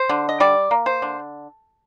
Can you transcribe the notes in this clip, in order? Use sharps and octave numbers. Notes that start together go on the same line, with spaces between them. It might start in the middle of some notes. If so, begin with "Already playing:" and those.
Already playing: C5
D3
D#5
G3 D5
A#3
C5
D3